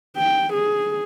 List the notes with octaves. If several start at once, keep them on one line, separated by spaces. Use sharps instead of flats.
G5
G#4